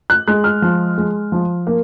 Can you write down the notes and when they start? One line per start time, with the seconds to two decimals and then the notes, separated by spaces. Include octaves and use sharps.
0.10 F#6
0.28 G#3 F#6
0.44 F6
0.62 F3
0.98 G#3
1.32 F3
1.67 A#3